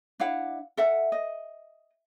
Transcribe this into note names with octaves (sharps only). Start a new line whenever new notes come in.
D4 E4 F5 F#5
A4 E5 F#5
D#5